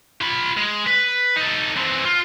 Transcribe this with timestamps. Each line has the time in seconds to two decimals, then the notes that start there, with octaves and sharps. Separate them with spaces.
0.21 F4 B5
0.58 G#3
0.87 B4
1.37 D#4 A4
1.77 E3 C4
2.05 F4